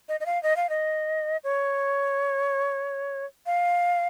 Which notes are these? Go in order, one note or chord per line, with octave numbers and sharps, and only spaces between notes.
D#5
D#5
F5
D#5
F5
D#5
C#5
F5